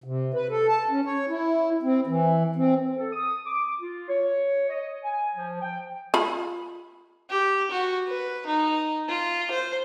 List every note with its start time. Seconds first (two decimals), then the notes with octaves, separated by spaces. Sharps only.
0.04 C3
0.34 B4
0.49 A4
0.68 A5
0.90 C#4
1.05 C#5
1.29 E4
1.83 C4
2.07 E3
2.56 C4
2.96 A4
3.13 D#6
3.46 D6
3.81 F4
4.09 C#5
4.68 D#5
5.04 G#5
5.36 F3
5.62 G5
6.14 F4 B5
7.31 G4
7.72 F#4
8.09 B4
8.48 D#4
9.10 F4
9.52 C5